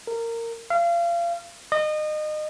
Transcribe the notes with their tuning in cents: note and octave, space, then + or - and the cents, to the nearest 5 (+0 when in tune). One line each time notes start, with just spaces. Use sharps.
A#4 -20
F5 -30
D#5 -30